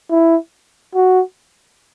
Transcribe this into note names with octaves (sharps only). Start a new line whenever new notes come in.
E4
F#4